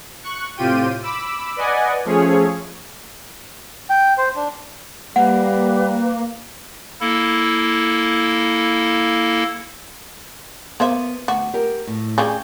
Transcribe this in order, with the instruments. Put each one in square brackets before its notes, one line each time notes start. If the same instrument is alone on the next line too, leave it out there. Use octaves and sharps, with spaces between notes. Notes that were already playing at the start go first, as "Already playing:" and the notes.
[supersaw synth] C#6 F#6
A2 C3 F4 G4 G5 D#7
B5 D6 E6
B4 D5 D#5 F#5 G#5
F3 A3 C#4 G#4 C#5
[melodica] G5
C5
D4
[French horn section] G3 [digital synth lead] A#3 [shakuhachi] B4 [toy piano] F#5
[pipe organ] A#3 E4 A4
[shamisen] A#3 C5 E5 [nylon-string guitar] B3
[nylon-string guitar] D2 [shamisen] F#4
[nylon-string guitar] G4 A#4
A2
[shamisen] C#3 G3 C#4 [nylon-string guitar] G5